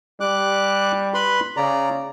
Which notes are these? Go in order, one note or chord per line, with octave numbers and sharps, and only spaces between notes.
G3 D6 F#6
B4 B5 C6
C#3 D5 A#5